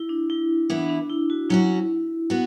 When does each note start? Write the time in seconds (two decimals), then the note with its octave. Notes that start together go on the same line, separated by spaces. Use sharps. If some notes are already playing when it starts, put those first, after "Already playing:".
Already playing: E4
0.09 D4
0.30 E4
0.70 E3 B3 D4 E4 B4
0.89 D4
1.09 E4
1.30 F#4
1.50 F#3 C#4 E4 F#4
2.30 B3 F#4